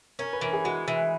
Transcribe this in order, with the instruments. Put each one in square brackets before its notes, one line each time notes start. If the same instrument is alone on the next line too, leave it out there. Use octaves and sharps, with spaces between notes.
[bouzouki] C#4 [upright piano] A#4
[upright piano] B4
[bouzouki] E3 [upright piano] A#4
[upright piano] G#4
[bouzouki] G#3 [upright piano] F#4
[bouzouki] E3